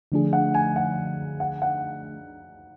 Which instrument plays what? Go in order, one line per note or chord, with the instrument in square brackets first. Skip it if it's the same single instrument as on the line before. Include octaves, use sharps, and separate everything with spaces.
[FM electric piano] D3 F3 A3 D4 G#4
[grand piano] F#5
G#5
F#5
F#5
F#5